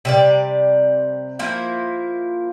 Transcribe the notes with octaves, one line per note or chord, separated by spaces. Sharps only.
C3 G3 D5
F3 A#3 E4